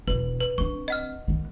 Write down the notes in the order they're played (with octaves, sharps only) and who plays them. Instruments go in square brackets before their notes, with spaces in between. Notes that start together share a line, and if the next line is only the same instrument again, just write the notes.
[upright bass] E1 B2 [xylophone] B4
[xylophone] B4
[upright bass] C4 D4 [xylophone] C#6
[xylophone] D#5 F#5 F6
[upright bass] D#3 B3